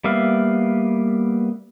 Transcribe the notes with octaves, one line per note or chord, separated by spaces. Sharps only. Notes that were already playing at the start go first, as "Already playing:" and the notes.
G3 A#3 B3 E5 F5